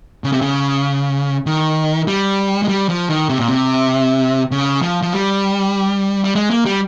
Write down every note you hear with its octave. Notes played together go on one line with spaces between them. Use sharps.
C#3
C3
C#3
D#3
G3
G#3
G3
F3
D#3
C3
A#2
C3
C#3
F3
F3
G3
G3
G#3
A#3
G3